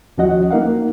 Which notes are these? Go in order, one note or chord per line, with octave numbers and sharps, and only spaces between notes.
D#2 F3 C#4 F#4 D#5 F#5
A#3 D#4 A#4 F5 F#5